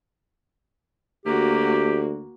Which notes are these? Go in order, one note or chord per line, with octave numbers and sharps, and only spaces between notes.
D2 A#3 F#4 G4